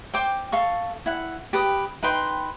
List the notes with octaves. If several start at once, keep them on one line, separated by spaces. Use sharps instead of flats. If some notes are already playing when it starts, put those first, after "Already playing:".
C5 G5 D6
A4 F5 C#6
E4 F#5
G4 B4 D#6
D#4 B4 G5 C6